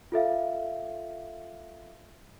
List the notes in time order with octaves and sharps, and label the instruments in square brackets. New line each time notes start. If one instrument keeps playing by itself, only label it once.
[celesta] F4 A4 E5 F5